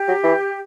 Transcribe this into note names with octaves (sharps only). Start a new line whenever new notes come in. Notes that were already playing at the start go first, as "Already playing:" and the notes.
Already playing: G4
F#3
E3